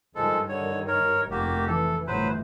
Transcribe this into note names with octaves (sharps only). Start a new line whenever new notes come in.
G2 D#3 F3 G#3 A4
D3 C#5
A#4 C#5
F1 A#3 F#4 G4
E3 A4
G1 A2 F#3 B4 C5